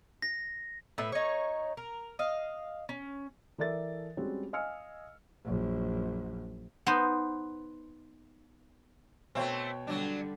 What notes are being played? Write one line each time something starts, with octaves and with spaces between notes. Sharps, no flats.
A#6
A2 B4 E5
D#4 C#5
A#4
D#5 F5
C#4
E3 A4 A#4 D5 E5 A6
G3 G#3 C4 C#4 F#4
D#5 F5 G#5 E6 F6 C#7
A#1 F#2
B3 D#4 C5
B2 A3 C4 C#5 G5
D3 F#3 G3 D4